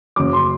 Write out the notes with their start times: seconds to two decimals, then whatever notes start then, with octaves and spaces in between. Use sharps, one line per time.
0.16 F#1 F#2 F#3 D6
0.33 C6